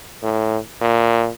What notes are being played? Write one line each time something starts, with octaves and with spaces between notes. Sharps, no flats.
A2
A#2